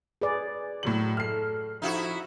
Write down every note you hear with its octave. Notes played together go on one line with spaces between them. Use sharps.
G#4 B4 D5
A2 F#3 F#7
A4 F6 C7
F3 D#4 E4 F#4